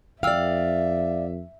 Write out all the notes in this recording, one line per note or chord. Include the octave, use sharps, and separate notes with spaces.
F2 D5 E5 F5 G5 E6 F6